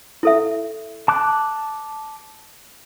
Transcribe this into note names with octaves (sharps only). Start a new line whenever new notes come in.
E4 A4 E5
A5 D6 F#6